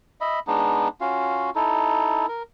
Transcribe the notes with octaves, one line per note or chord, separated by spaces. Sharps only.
D#5 E5 B5
G#3 B3 D4 D#4
C#4 F4 F#4 F5
D#4 E4 A4
A#4